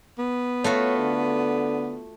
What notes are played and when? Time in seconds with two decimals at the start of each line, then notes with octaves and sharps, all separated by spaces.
0.18 B3
0.64 A3 F4 F#4 C#5
0.98 D3